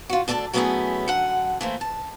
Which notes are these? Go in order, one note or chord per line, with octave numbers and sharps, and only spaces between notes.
F4 F#4
D2 D4 A4 D5 A5
F#3 A3 B3 C#4 E4 G#4
F#2 D3 F#5
E3 A3 A#3 C5
A5